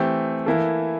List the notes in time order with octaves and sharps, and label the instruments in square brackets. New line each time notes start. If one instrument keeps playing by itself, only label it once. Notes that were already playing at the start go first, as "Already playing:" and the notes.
Already playing: [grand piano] E3 A3 C4 G4
E3 A#3 E4 A4